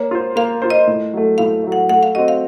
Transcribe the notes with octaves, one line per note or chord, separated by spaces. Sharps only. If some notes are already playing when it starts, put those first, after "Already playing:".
Already playing: A#3 C#5
F4 C5
A#3 F5
F4 C5
D#5
A2
F#3 A3
A2 F5
F#3 A3
F#5
A3 F#5
F5
C4 F#4 D#5
F5